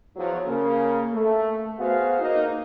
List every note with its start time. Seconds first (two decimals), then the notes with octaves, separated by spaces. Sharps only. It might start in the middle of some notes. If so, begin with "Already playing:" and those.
0.16 E2 F3 F#3
0.46 C#3 A#3
1.12 A3
1.79 B3 F#4 G#4 C5 F5
2.21 A#3 D#4